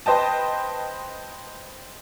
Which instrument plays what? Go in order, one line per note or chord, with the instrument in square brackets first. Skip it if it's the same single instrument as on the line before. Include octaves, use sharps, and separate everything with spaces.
[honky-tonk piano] B4 C5 D#5 G5 A5